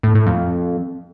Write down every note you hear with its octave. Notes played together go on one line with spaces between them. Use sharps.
A2
A2
F2